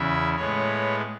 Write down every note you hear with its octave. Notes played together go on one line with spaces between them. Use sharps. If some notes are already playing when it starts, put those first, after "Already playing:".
Already playing: E2 C#3 E3 E5
A2 G#3 B3 C#5